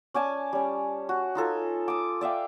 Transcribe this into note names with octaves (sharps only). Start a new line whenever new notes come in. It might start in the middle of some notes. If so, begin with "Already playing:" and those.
C#4 D5 G#5 A5
G3 C#4
F#4
D#4 F4 A4 G#5
D6 D#6
D5 E5 F5 G5